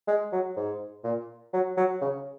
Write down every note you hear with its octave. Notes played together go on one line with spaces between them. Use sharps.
G#3
F#3
G#2
A#2
F#3
F#3
C#3